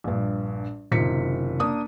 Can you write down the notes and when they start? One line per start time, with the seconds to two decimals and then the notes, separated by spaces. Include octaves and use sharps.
0.04 A#1 G2
0.92 F#1 C3 D#3 F4 B6 C#7
1.60 A#3 D4 D#6